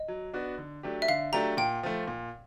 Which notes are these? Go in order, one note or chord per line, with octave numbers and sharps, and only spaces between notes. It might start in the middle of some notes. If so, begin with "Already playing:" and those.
Already playing: D#5
F#3
B3 D4 F#4
D3
F#3 A3 D4 G4
E5
D3 F5
F#3 A3 D4 G4 A#5
A#2 G5
F3 A3
A#2